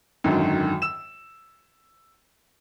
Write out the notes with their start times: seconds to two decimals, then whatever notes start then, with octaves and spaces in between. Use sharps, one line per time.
0.24 G#1 F#2 D3 D#3
0.82 E6 E7